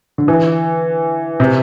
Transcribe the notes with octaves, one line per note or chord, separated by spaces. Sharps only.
D3
E3
C3